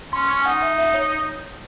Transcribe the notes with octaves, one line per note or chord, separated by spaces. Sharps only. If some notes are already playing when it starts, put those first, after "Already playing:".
C#4 C6
C#4 C#6
G#5
D#4 F#5
E5
E5
C#5